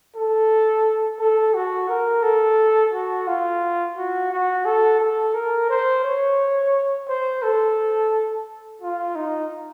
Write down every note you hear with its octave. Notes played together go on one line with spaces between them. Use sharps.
A4
A4
F#4
A#4
A4
F#4
F4
F#4
F#4
A4
A4
A#4
C5
C#5
C5
A4
F4
D#4